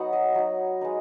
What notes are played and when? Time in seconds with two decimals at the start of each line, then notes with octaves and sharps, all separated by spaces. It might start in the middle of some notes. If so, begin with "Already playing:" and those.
Already playing: F#3 B3 D#4 F#5
0.13 D#5
0.35 F#3 D#4
0.81 G#3 B3 D#4